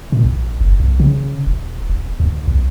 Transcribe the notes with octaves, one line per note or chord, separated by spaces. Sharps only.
A#2
A#1
F#1
B1
C#3
D#1
D#1
D2
B1